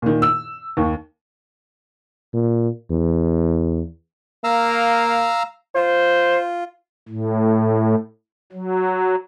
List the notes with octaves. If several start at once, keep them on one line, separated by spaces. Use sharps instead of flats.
A#2 D#3
E6
D#2
A#2
E2
A#3 F5 A#5 E6
F4 C5
A2
F#3